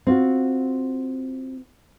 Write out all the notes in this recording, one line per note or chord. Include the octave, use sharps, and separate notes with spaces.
C4 F4 F#4